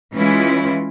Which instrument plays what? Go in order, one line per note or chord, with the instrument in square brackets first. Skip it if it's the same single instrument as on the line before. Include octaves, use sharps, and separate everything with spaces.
[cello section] E3 G#3 C#4 E4 F4